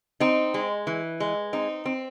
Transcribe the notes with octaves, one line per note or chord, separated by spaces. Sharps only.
C4 D#4
G#3
E3
G#3
C4 D#4
C4